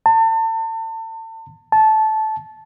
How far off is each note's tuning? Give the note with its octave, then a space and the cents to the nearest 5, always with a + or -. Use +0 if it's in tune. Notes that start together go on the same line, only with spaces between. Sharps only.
A5 +35
A5 -15